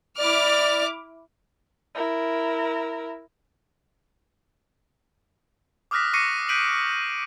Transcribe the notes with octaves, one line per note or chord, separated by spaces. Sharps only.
E4 D5 D6 F6
E4 A#4
D6 D#6 F6 F#6 A#6 B6
C#6 D6 A#6 C7 C#7 D#7
F#6 G6 B6 D7 D#7 F#7